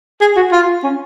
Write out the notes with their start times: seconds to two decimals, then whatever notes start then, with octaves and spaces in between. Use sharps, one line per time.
0.21 G#4
0.36 F#4
0.52 F4
0.84 C#4